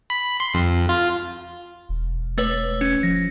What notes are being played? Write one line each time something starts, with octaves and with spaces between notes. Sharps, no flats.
B5
C6
F2
F4
E1
A3 B4 C#5
C#4
F3 A#6